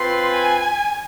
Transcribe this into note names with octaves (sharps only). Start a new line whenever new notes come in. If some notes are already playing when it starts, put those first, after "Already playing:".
Already playing: C4 F4 B4 C6
G#5